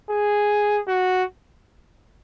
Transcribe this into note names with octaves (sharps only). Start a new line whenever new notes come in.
G#4
F#4